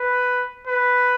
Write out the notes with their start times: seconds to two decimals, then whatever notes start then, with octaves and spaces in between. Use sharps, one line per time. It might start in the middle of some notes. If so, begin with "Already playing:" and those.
Already playing: B4
0.67 B4